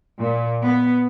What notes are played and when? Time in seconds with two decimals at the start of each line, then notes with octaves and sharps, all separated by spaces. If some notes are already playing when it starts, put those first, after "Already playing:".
0.21 A#2
0.65 B3